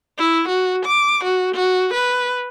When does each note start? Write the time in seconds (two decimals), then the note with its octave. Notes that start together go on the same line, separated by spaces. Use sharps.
0.18 E4
0.49 F#4
0.86 D6
1.24 F#4
1.55 F#4
1.94 B4